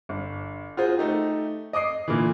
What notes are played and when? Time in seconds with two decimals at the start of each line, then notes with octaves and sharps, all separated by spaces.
0.09 G1
0.77 F4 F#4 G#4 C5
0.98 A3 D#4 G4
1.73 D#5 D6 D#6 C7
2.08 A#2 D3 E3